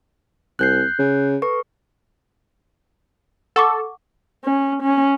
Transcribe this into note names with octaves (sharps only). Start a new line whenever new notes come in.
C2 F#6 G6 C7
C#3
A4 B4 C#6
A4 F#5 C#6 D6
C#4
C#4